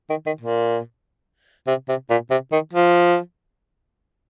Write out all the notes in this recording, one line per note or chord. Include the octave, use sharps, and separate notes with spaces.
D#3
D#3
A#2
C3
C3
A#2
C3
D#3
F3